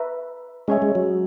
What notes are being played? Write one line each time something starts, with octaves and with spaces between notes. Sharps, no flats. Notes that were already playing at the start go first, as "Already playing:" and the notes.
Already playing: B4 E5 A#5 C#6
G#3 C#4 G#4 C#5 E5 G#5
G#3
F#3